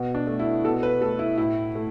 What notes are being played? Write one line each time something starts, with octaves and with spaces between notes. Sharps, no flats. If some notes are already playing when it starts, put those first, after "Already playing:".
Already playing: B2
D4
A3
E4
B2 A4
B4
A3 A4
E4
A2 E4
A3